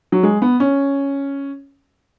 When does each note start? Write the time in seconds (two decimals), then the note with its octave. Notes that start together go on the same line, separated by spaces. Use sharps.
0.12 F#3
0.23 G#3
0.42 B3
0.60 C#4